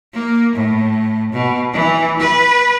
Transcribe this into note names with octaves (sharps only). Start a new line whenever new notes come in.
A#3
A2
B2
E3
B4